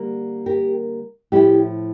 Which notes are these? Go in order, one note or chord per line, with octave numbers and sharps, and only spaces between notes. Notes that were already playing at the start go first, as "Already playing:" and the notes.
Already playing: D3 G3 A#3
G4 A#4
A2 F3 A3 E4 G4